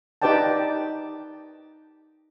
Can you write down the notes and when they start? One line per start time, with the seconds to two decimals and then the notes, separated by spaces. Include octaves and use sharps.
0.22 D#4 G4 B4 D5 G5 A5